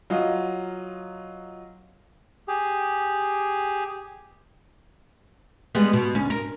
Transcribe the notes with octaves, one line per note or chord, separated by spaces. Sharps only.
F#3 F4 D#5
G4 G#4
G3 G#3 B3
B2
D2 C#4
A#4